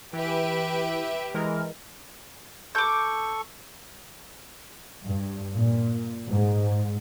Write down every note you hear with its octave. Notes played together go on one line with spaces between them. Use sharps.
E3 G4 B4 E5
E3 G#3 A#4
A4 C#6 D6 G6
G2
A#2
G#2